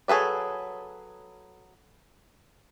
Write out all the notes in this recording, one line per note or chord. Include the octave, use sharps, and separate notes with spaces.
F#3 G#4 A4 B4 D5